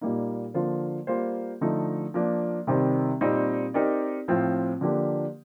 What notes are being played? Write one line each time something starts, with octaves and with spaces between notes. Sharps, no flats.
A#2 G3 A#3 D#4
D3 F3 A#3 F4 C5
G3 A#3 F4 C5
D3 F3 A3 D#4
F3 A#3 D4
C3 D#3 G3 C4
A#2 G3 C4 D#4
C4 D#4 G4 A#4 D5
A2 F3 C4 F4 C5
D3 F3 A#3 D4 G4